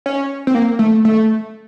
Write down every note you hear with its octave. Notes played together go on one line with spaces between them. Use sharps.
C#4
C4
A#3
A3
A3